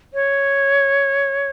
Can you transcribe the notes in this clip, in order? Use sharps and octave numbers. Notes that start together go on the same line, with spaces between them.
C#5